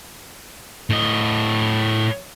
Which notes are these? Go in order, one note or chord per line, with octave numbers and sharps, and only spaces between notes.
A2 D#5